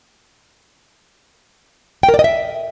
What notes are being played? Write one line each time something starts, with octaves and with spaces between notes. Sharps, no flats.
G5
A#4
D5
D#5
E5